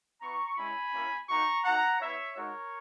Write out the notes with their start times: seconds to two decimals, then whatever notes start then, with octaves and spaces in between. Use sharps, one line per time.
0.21 B3 E4 A#5 C#6
0.57 G#3 C#4 E4 G#5 B5
0.93 A#3 C#4 E4
1.29 A#3 D#4 F#4 A#5 C#6
1.64 A#3 D#4 F#4 F#5 A#5
2.00 B3 E4 C#5 E5
2.36 G#3 D#4 F#4 A#4 C#5